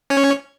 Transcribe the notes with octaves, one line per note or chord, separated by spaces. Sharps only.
C#4 C#5